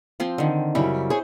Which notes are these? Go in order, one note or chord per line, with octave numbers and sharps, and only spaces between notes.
F3 C4 C6
D3 D#3
F#2 C#3 G3 E4
G#4 C5 C#5